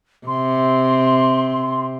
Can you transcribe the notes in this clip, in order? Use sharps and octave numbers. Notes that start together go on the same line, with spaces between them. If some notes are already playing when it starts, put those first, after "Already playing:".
C3 C6